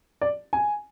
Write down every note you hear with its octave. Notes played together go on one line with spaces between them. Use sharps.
D5
G#5